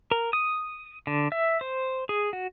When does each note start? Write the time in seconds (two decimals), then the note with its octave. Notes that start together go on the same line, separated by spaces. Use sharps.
0.12 A#4
0.33 D#6
1.07 D3
1.32 E5
1.61 C5
2.09 G#4
2.33 F#4